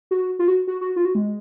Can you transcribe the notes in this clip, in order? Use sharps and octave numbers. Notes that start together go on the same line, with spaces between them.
F#4
F4
F#4
F#4
F#4
F4
F#4
G#3